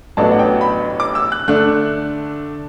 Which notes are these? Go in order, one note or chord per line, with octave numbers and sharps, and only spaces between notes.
A1 A2 F#3 B3 D4 A5
F#5
G5
B5
D6
E6
F#6
D3 A3 D4 F#6